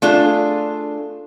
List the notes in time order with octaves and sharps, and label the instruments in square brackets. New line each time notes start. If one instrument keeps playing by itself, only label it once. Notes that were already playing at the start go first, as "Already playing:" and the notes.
[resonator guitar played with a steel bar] A3 D4 F4 G#4